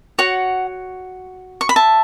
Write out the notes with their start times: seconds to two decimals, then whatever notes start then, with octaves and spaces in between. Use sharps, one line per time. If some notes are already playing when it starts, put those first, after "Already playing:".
0.19 F#4 C#5 F#5
1.61 C#6
1.69 B5
1.76 E5 A5